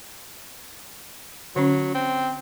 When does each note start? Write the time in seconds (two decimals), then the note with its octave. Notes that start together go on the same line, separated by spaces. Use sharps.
1.56 D3 F#3 C#4
1.95 C4